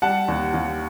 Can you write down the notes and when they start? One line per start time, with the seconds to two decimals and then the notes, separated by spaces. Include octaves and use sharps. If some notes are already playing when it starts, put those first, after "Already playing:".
0.02 G3 F#5 A5
0.28 D#2
0.54 D#2